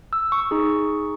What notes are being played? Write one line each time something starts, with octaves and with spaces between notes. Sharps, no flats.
E6
C#6
D#4 G#4